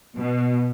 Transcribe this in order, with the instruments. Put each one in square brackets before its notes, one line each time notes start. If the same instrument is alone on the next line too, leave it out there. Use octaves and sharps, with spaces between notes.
[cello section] B2